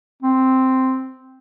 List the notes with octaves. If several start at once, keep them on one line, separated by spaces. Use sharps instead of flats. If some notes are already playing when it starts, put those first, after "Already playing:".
C4